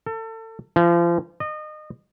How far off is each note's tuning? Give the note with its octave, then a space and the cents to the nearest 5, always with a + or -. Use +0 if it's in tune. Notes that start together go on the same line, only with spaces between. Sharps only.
A4 +30
F3 -35
D#5 -30